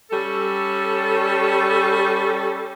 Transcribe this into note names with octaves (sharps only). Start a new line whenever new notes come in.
G3 C#4 A4